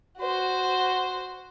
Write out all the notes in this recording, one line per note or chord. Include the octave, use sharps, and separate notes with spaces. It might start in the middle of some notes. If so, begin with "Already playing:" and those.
F#4 C5